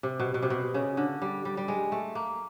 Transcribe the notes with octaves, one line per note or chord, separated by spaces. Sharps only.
C3
B2
B2
C3
B2
C#3
D3
G3
G3
G3
G#3
A3
A#3